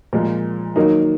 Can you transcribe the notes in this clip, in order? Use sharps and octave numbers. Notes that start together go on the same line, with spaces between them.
A#2 F3 G#3
D#3 F#3 A#3 D#4